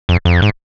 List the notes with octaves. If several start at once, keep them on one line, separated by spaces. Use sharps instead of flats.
F2
F2
G#2